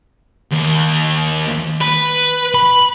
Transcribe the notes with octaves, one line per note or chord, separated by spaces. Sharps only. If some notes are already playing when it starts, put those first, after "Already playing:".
D#2
B4
B5